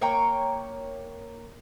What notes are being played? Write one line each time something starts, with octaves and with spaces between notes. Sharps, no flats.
A#3 C#5 G5 A#5